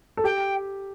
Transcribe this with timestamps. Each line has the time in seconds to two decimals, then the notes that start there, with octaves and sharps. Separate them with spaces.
0.17 A4
0.24 G4 G5